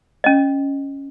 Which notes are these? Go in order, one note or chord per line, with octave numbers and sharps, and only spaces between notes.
C#4 D#5